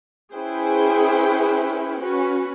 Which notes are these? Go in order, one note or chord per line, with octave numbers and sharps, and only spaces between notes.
C#4 E4 G#4 B4 C5 G5
C#4 F#4 B4